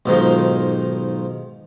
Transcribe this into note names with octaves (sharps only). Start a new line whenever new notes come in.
B1 G#2 D#3 F3